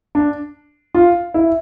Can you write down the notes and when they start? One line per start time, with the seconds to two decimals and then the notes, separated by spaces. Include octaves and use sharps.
0.15 D4
0.95 F4
1.34 E4